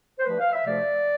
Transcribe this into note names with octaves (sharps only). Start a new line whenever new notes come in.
C5
G2 F3 A3 B4
F5
E5
D2 C3 F3 A3 D5